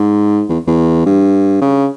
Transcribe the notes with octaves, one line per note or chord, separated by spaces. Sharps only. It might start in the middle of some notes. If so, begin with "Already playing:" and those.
Already playing: G#2
E2
E2
G2
C#3